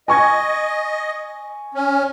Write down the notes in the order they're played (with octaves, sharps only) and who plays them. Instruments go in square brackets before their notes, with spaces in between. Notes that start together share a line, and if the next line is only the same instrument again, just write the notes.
[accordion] D#5 [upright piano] G#5 C#6 G#6
[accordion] C#4